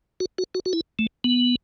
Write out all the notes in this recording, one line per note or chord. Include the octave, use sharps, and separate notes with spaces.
F#4
F#4
F#4
F#4
E4
A3
B3